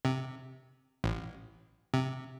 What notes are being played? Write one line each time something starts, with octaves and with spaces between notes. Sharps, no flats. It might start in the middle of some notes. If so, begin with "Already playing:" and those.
C3
A1
C3